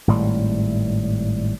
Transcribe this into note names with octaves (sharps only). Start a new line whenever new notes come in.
G#1 A2 G3